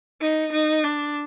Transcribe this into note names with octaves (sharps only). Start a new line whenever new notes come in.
D#4
D#4
D4